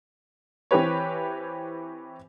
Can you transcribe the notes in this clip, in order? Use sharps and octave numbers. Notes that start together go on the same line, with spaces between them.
E3 C4 G4 B4 C#5